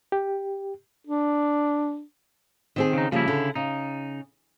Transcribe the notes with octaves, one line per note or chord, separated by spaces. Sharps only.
G4
D4
D#3 C4 G#4
C#3 D#4
C#3 F3 G3 A#3 E4
D3
C#3 D#4